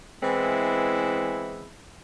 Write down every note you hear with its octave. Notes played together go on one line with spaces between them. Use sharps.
E3 G#3 B3 C4 E4